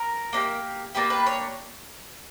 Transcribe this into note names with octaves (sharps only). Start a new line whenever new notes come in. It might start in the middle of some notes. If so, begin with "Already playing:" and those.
Already playing: A#4
A#3 D4 G4
A#3 D4 G4 B4
B4
C#5